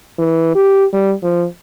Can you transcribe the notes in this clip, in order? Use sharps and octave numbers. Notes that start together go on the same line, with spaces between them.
E3
G4
G3
F3